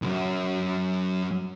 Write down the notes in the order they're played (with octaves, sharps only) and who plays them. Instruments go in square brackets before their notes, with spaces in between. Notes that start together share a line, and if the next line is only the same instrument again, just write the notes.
[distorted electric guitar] B1 F#2